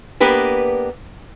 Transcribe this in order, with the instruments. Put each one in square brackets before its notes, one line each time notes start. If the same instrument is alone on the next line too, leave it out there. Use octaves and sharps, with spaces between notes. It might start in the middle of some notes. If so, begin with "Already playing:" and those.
[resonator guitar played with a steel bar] A#3 B3 D4 G4 B4